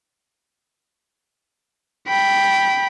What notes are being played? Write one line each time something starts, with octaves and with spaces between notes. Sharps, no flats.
G5 B5